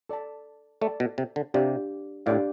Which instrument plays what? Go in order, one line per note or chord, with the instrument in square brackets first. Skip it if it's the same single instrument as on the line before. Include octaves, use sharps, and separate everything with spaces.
[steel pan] A4 D5 A5
[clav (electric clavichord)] A3 [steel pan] A4 D5 A5
[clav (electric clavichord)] B2
C3
D3
[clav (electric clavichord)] C3 [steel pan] D4 G4 D5 F5
[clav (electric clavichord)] A2 [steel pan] D4 G4 D5 F5